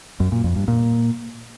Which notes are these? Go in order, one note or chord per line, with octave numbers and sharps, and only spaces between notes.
F#2
A#2
F2
G2
A#2